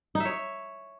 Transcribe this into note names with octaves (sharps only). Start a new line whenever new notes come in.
D#4
E5
C#5